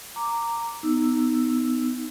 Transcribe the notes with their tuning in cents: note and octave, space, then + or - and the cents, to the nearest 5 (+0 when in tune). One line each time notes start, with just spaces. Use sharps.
A#5 -10 D6 +0
B3 +20 D#4 +0 E6 +0